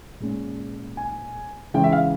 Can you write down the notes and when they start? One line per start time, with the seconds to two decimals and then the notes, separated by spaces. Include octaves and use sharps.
0.20 A#2 G#3 C#4
0.97 G#5
1.74 C#3 E3 G#3 C#4 G5
1.84 E5
1.92 F5